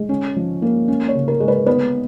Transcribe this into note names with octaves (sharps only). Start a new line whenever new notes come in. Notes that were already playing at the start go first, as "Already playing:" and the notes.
Already playing: G#3
C#4
F3
A#3
C#4
C#5
C#3
A#4
G#3
B4
B3 B4